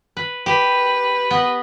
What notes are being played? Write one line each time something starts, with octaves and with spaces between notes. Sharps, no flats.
B4
G4 B4
B3 D#5